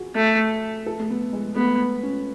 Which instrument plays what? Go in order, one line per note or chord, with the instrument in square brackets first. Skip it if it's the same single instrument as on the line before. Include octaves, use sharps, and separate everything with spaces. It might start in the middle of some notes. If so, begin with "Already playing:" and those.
Already playing: [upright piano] F#4 G#4
[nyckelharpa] A3
[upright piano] A4
A3
B3
G#3
[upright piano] A3 [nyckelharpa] B3
[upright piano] C#4